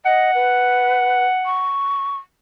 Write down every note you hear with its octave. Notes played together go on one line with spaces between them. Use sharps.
D#5 F#5
B4
C#6